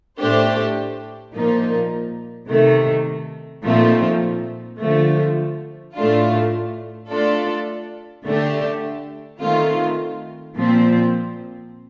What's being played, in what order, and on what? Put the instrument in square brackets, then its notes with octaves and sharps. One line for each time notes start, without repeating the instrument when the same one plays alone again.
[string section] A2 A3 D4 G4 C5
A#2 F3 A#3 D#4
C3 D#3 A3
A#2 F3 A3 C4 D#4
D3 F3 A3
A2 A3 D4 F4
A3 D4 F4 A4 D5
D3 A3 D4 G4
D#3 A3 C4 F4
A#2 F3 C4